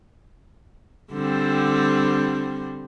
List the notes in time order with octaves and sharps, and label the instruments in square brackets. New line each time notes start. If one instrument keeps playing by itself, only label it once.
[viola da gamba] D3 G3 C4